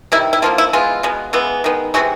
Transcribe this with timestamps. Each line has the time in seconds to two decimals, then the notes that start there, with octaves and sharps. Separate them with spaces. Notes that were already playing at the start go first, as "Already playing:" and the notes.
0.12 C3 D#3 G3 E4
0.33 E4
0.42 D3 F3 A#3 F4
0.58 E4
0.73 E3 G#3 B3 F4
1.03 B2 G#3 B3
1.33 C#3 E3 G#3 B3
1.64 D#3 G#3 B3
1.94 C3 E3 G#3 F#4